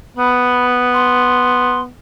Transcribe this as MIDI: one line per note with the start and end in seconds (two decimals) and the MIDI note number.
0.17 1.89 59
0.17 0.65 83
0.93 1.81 84